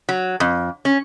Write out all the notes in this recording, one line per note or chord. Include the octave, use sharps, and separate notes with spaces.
F#3
F2
C#4